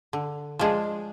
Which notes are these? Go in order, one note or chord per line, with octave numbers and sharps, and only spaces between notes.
D3
F3 G#3 D4 G#4